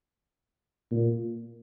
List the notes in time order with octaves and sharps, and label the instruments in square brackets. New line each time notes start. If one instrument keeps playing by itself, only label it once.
[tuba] A#2